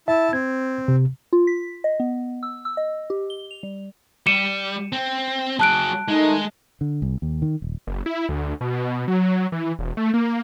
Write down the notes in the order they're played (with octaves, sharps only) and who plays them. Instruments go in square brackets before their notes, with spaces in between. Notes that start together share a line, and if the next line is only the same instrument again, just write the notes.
[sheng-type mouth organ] E4 A5 [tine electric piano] E5
[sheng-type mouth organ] C4 [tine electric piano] G#6
[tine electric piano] C3
[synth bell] F4
B6
D#5
B3
E6
E6
D#5
G4
G7
F7
G3
[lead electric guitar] G3 [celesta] C#7 D#7 E7
[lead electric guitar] C4
[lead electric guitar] F#3 G#4 [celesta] A5 F#6 D7
[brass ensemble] D#3 A3 D#4 [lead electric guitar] G#3
[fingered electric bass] D3
C2
D#2
D#3
D#1
[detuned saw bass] F#1
E4
D2
B2
F#3
E3
E1
A3
A#3